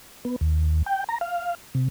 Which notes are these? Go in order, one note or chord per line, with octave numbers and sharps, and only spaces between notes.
B3
D#2
G5
A#5
F5
C3